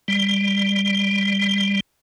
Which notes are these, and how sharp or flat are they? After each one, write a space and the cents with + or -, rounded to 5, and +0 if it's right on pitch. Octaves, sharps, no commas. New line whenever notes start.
G3 +20